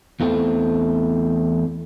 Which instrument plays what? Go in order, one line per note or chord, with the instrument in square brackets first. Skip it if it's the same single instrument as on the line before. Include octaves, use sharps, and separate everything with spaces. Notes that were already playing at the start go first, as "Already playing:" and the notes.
[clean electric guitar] E2 E3 A3 C4